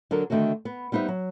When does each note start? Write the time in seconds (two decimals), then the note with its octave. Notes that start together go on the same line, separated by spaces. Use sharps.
0.11 D3 F#3 D4 A4 A#4
0.30 D3 D#3 A3 A#3 F#4
0.65 B3
0.92 G3 B3 D#4 C5 E5
1.08 F#3